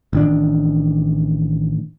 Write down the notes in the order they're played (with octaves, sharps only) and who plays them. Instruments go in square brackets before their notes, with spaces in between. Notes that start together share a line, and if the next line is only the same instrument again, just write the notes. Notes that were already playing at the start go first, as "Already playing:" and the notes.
[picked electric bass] A1 D#3 D4